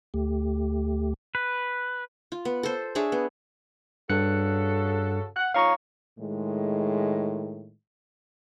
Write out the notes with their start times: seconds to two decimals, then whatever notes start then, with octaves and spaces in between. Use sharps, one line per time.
0.14 D2 A3 G4
1.35 B4
2.32 F4
2.45 B3
2.63 A4 C5
2.95 D4 G#4 C#5 E5
3.12 B3
4.09 G2 C#3 F#4 A4 F#6 C#7
5.36 F#5 F#6
5.54 D#4 F4 C#5 F5 A#5 C#6
6.19 A2 D#3 G#3